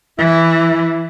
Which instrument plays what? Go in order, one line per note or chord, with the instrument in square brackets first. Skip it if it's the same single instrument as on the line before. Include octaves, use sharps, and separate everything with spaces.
[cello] E3 [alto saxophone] E4